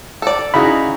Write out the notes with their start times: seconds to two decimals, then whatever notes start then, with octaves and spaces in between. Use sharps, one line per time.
0.22 A4 D5
0.54 C#3 D#4 E4 F#4 B5